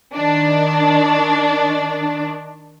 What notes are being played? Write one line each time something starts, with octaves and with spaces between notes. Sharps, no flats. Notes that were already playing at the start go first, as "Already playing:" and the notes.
D#3 D4